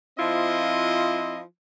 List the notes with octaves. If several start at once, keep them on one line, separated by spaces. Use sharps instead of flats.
F3 C4 E4 F4 D#5